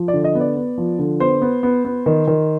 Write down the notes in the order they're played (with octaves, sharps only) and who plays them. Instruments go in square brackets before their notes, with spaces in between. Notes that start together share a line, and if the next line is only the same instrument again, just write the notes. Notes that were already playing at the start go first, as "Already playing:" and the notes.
Already playing: [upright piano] F3
D5
D3
D#5
B3
D5
B3
F3
D3
B3 C5
B3
B3
B3
D#3
D#3